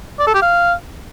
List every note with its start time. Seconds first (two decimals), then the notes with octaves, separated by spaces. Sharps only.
0.19 D5
0.27 A4
0.34 G4
0.42 F5